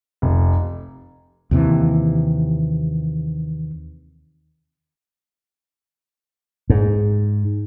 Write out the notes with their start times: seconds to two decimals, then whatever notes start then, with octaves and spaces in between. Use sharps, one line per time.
0.22 F1
1.51 D#2 C3 E3
6.70 G#2